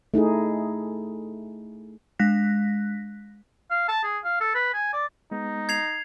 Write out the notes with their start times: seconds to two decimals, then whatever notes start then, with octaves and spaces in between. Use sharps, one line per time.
0.14 A3 D#4 E4 G#4
2.19 G#3 F#6 A#6 B6
3.71 F5
3.88 A5
4.03 G#4
4.24 F5
4.41 A4
4.55 B4
4.74 G#5
4.93 D5
5.31 G#3 B3 D#4
5.69 G#6 C7 F7